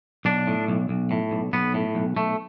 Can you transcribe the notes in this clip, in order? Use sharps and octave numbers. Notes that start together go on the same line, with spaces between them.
B1 D4
A2
B1
B1
A2
B1
B1 B3
A2
B1
B1 A3